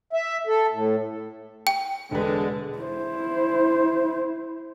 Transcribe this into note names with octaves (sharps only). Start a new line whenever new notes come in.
E5
A4
A2
G5
E1 D3 G#3 B4
E4 C5